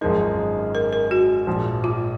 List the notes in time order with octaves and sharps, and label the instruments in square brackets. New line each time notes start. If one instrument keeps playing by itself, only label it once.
[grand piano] G#1 F#2 F3 G#3 D#4 [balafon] A#4
[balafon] A#4
A#4
F#4
[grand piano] A#1 G#2 F3
[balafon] F4